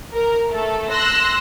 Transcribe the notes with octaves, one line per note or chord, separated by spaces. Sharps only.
A#4
A3 A4
C6 E6 F#6 A#6